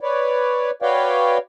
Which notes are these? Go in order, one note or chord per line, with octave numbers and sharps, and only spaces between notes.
B4 C#5 D5
F#4 B4 C#5 D5 F5 G5